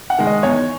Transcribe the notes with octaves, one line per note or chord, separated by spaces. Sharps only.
F#5
D#3 G#3
D#5
E2 C#5